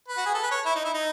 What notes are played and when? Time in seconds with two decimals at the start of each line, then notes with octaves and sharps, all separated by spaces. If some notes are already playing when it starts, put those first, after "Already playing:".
0.08 B4
0.17 F#4
0.26 G#4
0.34 A4
0.43 B4
0.51 C#5
0.65 E4
0.76 D#4
0.84 E4
0.94 D#4